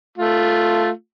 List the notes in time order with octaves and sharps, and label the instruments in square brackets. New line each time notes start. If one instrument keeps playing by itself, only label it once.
[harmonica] A3 F4